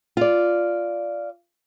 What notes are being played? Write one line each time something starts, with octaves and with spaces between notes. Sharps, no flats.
F4 D5